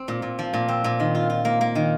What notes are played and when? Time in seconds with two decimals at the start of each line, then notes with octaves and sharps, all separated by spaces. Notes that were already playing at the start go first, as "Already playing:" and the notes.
Already playing: C4
0.08 A#2
0.22 A#2
0.39 F3
0.53 A#2
0.68 C4
0.84 A#2
1.00 D#3
1.15 F4
1.30 F4
1.45 A#3
1.61 A#3
1.75 D#3